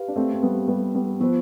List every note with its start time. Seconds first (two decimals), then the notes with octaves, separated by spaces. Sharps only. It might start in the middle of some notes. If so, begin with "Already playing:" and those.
Already playing: G4 B4 F5
0.08 D4
0.16 A3 C4
0.34 C4
0.43 G3 B3
0.68 G3 B3
0.94 G3 B3
1.20 F3 B3 F4 C5